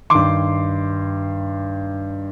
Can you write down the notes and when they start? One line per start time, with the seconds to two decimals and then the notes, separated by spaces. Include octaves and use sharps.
0.10 G2 D#3 C6 D6